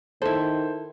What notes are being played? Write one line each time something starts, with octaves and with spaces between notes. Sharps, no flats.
D#3 E4 A4 C5